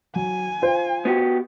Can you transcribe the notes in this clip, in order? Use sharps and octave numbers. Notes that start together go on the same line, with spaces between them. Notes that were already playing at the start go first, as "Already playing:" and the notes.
F#3 G#5
F4 C5
B3 F#4 G4